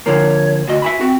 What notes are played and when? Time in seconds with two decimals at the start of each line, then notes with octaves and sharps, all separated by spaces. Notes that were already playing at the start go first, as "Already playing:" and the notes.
0.06 D3 F3 A#3 C#5
0.68 D2 F#4 D#5
0.82 E5 G#5 B5
1.01 C4 F#4